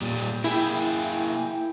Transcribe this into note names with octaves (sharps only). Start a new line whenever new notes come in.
A#2 G3
A#3 E4 G#4 G5